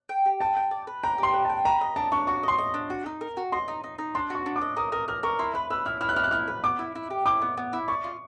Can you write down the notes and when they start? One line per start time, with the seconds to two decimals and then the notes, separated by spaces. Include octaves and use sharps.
0.09 G5
0.26 G4
0.40 G5 A5
0.57 G5
0.71 D5
0.87 B4
1.03 G5 A#5
1.18 G4 C6
1.33 B4
1.45 G5 A5
1.65 B4 A#5
1.81 D#5
1.96 D4 A5
2.12 D4 C#6
2.27 F#4 C#6
2.43 D#5 C6
2.58 D#5
2.74 D4
2.90 F#4
3.06 D#4
3.21 A#4
3.37 F#4
3.52 D#5 C6
3.68 D#4
3.84 D#4
3.98 D#4
4.15 D4 C6
4.30 F#4 C#6
4.46 D4
4.56 D6
4.61 D#5
4.77 A#4 D#6
4.92 A#4 D#6
5.08 A#4 F6
5.23 A#4 C#6
5.39 E4 C6
5.54 B4 B5
5.70 B4 E6
5.86 E4 F6
6.01 E4 F6
6.09 F#6
6.16 E4 F6
6.24 F#6
6.31 E4 F6
6.48 B4
6.64 B3 D6
6.79 E4
6.95 E4
7.10 G4
7.26 E4 D6
7.42 B3
7.57 B3
7.73 E4
7.88 D5 C#6
8.04 F4